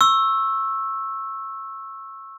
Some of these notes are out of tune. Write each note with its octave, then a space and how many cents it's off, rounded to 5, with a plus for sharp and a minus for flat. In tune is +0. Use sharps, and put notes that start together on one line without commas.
C#6 -25 E6 +0